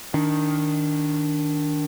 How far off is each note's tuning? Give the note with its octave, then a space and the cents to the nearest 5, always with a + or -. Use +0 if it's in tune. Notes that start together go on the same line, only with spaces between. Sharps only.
D#3 +0 D4 -10